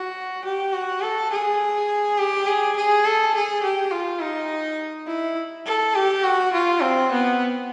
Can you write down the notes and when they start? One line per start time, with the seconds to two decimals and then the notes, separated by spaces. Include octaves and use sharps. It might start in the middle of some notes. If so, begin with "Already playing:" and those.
Already playing: F#4
0.44 G4
0.73 F#4
1.01 A4
1.31 G#4
2.18 G4
2.47 G#4
2.76 G#4
3.05 A4
3.34 G#4
3.63 G4
3.91 F4
4.20 D#4
5.07 E4
5.66 A4
5.95 G4
6.24 F#4
6.53 F4
6.81 C4
7.11 B3